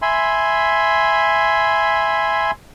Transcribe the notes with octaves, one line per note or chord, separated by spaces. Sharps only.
E5 G#5 B5 C6